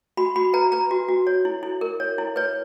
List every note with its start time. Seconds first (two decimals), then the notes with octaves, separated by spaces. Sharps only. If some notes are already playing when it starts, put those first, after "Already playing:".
0.17 F#4 B5
0.36 F#4 B5
0.54 B4 A#5
0.72 B4 A#5
0.91 F#4
1.08 F#4
1.27 C#5
1.45 E4
1.63 E4
1.81 A#4
2.00 C#5
2.18 E4
2.36 B4 C#5